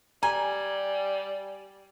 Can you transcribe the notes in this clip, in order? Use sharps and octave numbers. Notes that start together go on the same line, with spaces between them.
G3 G#5 A#5